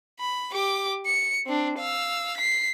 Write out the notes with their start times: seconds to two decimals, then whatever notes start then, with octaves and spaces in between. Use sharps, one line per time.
0.19 B5
0.52 G4 D6
1.06 C#7
1.46 C4 D4
1.78 F5 E6
2.37 B6 C7